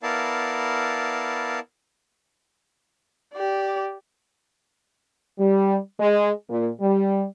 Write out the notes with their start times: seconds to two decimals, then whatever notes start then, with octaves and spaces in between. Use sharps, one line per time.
0.03 B3 E4 A#4 D5 F5 A5
3.34 G4 D5
5.39 G3
5.99 G#3
6.48 A#2
6.80 G3